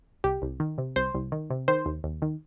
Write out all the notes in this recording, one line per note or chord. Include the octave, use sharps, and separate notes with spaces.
C2 G4
C2
D#3
C3
C2 C5
C2
D#3
C3
D#3 C5
D#2
D#2
D#3